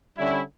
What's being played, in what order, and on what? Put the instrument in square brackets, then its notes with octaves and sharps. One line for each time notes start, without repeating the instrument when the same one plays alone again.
[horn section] D3 G3 C#4 E4